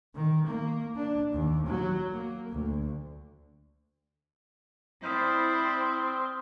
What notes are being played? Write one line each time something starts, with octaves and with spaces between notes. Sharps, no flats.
D#3
A#3
D4
D#2
F#3
A#3
D2
C4 E4 C5 D5 D#6 F6 G6